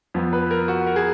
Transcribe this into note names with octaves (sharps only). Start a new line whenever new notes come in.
F2 F3 B3
B4
A#4
F#4
A#4
G#4